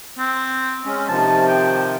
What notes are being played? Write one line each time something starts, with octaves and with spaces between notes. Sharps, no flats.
C4
G#3 C#4
C3 D#3 F3 A5
G5